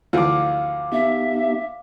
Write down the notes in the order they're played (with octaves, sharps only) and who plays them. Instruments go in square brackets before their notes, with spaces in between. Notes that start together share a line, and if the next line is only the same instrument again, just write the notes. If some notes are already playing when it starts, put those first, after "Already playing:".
[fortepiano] D2 E3 F3 [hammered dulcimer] F5 D6
[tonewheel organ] B3 D#4 G4 [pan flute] E5